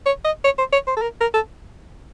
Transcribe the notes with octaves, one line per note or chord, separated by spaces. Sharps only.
C#5
D#5
C#5
C5
C#5
C5
A4
A#4
A#4
A4